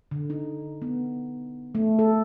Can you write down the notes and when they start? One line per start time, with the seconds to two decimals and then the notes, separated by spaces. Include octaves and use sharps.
0.11 D3
0.30 D#4
0.82 B3
1.75 A3
1.99 A4